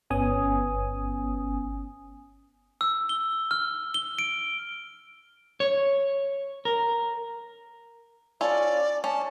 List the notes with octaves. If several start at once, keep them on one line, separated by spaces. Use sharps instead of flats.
G1 B3 C#4 G#5 D#6
E6
G7
F6
G7
D7
C#5
A#4
C#4 F4 A4 D5
C#4 A5